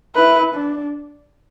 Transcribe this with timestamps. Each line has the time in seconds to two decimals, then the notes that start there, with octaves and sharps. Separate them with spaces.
0.15 E4 B4
0.55 D4